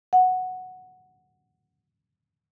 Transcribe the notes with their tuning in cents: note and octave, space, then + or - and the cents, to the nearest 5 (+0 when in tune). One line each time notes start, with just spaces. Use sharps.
F#5 -5